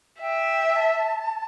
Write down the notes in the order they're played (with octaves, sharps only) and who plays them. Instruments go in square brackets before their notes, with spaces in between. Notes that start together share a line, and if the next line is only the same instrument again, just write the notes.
[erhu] E5 [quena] G5
[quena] A5